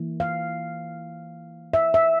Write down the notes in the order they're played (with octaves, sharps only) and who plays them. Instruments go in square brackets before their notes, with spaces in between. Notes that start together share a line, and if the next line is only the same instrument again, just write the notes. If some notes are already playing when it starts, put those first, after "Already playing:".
Already playing: [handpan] E3 A#3 E4
F5
E5
E5